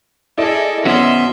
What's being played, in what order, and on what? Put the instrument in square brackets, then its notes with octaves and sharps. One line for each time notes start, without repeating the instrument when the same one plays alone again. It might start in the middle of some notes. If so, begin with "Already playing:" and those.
[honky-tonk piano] E4 D5 D#5 [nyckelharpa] G#4 A4
[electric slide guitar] B3 C#4 F#4 [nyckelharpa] E5 C6